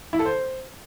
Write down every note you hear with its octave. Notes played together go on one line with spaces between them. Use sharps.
E4
A4
C5